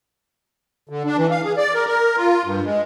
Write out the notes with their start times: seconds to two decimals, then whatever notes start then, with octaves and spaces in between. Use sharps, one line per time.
0.89 D3
1.05 D4
1.17 E3
1.31 F5
1.43 G#4
1.57 D5
1.74 A#4
1.87 A#4
2.17 F4
2.45 G2
2.65 G#3